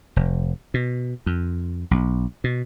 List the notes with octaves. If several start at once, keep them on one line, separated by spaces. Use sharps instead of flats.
F1
B2
F2
B1
B2